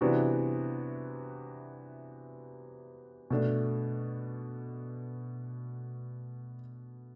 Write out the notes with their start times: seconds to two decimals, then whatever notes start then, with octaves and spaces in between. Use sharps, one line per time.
0.01 C3 E3 B3 D4 F#4
3.30 B2 A3 D4